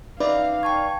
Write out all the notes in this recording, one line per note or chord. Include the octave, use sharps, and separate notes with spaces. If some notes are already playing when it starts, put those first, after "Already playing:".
C#4 D#4 B4 D5 E5 F5
G5 A5 C#6 G#6